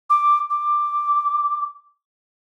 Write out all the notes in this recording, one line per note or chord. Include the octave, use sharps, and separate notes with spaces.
D6
D6